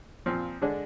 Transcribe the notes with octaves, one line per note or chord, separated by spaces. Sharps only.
A#2 F3 C4
D3 G#3 D4